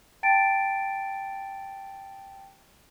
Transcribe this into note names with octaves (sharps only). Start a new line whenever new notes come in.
G5 A5 A6 D7